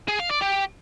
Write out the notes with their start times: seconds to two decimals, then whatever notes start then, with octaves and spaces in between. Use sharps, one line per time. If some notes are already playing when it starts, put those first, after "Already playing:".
0.08 G#4
0.19 F5
0.30 D5
0.41 G4